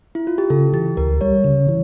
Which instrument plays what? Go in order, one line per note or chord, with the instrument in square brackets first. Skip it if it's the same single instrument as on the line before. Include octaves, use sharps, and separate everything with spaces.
[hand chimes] E4
F4
G4
[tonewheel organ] C#3 [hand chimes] A4
[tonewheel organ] E3 [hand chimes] G4
[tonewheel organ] D2 [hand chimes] A#4
[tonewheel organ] G3 [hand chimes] C#5
[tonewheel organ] C#3
E3